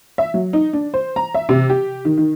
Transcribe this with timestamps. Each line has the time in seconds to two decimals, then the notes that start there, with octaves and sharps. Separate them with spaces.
0.18 E5
0.34 F#3
0.53 D#4
0.73 D4
0.94 C5
1.16 A#5
1.34 E5
1.49 C3
1.70 G4
2.05 D#3
2.17 D#3